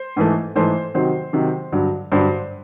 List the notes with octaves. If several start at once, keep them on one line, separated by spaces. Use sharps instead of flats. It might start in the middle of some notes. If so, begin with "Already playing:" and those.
Already playing: C5
G#2 E3 A3
G#2 E3 A3 C5
C3 D#3 F#3 C5
C3 D#3 F#3
G2 D3 F#3
G2 D3 F#3 C5